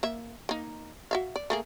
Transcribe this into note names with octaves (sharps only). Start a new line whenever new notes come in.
A#3 E5
A#3 D#4
F#4 E5 F5
D5
A3 A#3 G#4